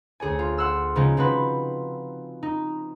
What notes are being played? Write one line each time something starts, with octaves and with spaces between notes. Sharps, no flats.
D2 G#4 C#5 G#5
F4
F#5 C6 E6 F6
C#3 F3 G#3 C#4 D#4
F3 C4 F#4 B4
D#4